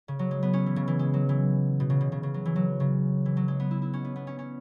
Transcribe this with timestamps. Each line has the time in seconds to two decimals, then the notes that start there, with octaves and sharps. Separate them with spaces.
0.08 C#3
0.19 F#3
0.31 G#3
0.43 B3
0.53 C#4
0.66 E3
0.76 C#3
0.88 E3
0.99 G#3
1.14 F#3
1.29 E3
1.80 B2
1.90 C#3
2.01 B2
2.12 C#3
2.23 C#3
2.34 F#3
2.46 E3
2.56 F#3
2.80 C#3
3.26 E3
3.37 F#3
3.48 G#3
3.60 B3
3.71 E4
3.82 E4
3.93 C#4
4.05 B3
4.16 B3
4.27 C#4
4.39 C#4